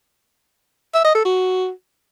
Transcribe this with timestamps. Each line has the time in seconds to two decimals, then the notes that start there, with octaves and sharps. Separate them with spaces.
0.94 E5
1.04 D#5
1.15 A4
1.25 F#4